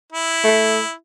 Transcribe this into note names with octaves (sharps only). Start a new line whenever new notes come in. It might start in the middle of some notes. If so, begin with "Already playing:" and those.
E4
A3